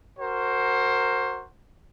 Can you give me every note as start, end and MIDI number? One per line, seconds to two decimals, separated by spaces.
0.17 1.46 66
0.17 1.46 70
0.17 1.46 72